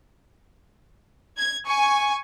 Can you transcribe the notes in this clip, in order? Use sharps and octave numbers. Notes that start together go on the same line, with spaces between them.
G#6
G#5 C#6